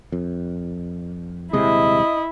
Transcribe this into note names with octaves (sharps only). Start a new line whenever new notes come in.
F2
D#1 C3 G#3 E4 D#5